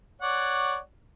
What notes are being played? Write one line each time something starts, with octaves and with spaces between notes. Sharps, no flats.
C#5 D5 F#5